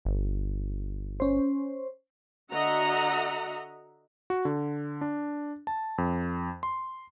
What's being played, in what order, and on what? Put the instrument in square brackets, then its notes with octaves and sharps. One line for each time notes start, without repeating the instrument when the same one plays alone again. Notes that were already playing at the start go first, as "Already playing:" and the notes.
[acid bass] G1
[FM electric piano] C#4 C5
[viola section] D3 F#4 D#5 E5 F#5 A#5
[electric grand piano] F#4
D3
D4
A5
F2
C6